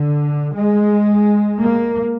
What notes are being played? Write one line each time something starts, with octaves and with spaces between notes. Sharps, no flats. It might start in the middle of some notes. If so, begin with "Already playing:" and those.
Already playing: D3
G#3
A#3